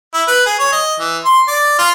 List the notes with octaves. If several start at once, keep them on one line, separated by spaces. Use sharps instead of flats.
E4
B4
G#4
C#5
D#5
E3
C6
D5
F4